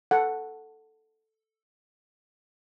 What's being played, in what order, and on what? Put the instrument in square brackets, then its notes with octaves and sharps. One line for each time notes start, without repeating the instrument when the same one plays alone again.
[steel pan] A4 F#5